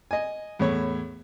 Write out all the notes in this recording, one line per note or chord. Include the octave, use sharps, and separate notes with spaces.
D#5 G#5
E2 A2 C#5